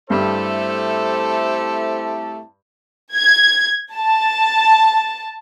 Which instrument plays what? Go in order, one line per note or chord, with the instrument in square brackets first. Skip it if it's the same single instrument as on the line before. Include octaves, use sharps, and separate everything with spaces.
[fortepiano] G2 [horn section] A3 G4 A4 [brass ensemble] C4 E4 A5 [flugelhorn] C5
[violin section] G#6
A5